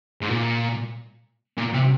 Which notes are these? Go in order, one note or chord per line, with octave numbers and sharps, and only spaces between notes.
G#2
A#2
A#2
C3